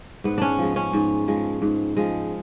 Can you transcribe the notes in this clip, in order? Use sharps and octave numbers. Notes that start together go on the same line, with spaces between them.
G#2 B3
C#4 D4
F3 G#3
C#4
G#2
F3 G#3
G#2
F3 G#3